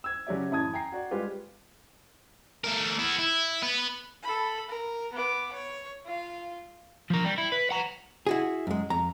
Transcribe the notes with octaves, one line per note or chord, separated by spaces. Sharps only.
E6 G#6
C#3 F#3 C#4 G4 D5 E5
A1 F#2 E4 A5 D#6 G#6
G5 G#5 A#5 C7
F#4 D5
G3 G#3 F4 G4 B4
A3 A#4
B3 E4
E4
B3 B4
A4 B5
A#4
B3 D6
C#5
F4 F5
F3 A#4
G3
E4
B4
F#5 A#5
E4 F#4 G#4
F#2 G#3
F2 A#5